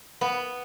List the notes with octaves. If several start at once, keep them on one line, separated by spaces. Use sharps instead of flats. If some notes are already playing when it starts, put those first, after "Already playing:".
B3